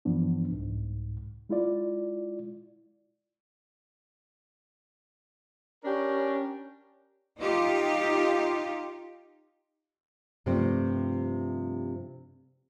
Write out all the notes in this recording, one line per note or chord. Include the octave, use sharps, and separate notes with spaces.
G2 E3 F3 B3 D4
C2 G#2
G#3 E4 F4 D5
C#4 D4 G4 A#4
D#4 F4 G4
G2 C3 F3 A3 C4